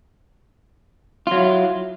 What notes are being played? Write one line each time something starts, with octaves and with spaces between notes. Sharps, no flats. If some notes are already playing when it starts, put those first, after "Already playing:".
F#3 E4 F4